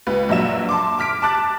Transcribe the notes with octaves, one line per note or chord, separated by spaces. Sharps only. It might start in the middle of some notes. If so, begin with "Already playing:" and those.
C#2 B4
A#1 F#3 E5 E7
A5 C6 D6
D6 F6 B6 D7
A5 D6 F#6 A6